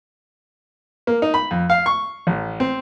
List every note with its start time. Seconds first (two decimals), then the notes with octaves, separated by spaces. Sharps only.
1.07 A#3
1.22 D#4
1.34 B5
1.51 F2
1.70 F5
1.86 C#6
2.27 A1
2.60 C4